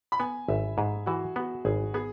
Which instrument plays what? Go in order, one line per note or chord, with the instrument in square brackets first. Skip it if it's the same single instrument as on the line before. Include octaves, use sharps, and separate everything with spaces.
[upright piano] B5
[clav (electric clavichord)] B3 [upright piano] G#5
[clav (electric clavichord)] G#1 [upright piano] E5
[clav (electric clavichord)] G#2 [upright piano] G#4
[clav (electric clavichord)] E3 [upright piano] F#4
[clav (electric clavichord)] B3 [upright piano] F#4
[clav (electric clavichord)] G#1 [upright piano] G#4
[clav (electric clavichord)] B3 [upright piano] G#4